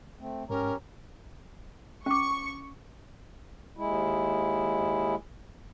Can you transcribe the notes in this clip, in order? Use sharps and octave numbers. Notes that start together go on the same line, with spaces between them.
A3 C4
G#2 C#4 G4 A#4 C#5 A#5
C#4 C#6 D6
D#2 G#3 E4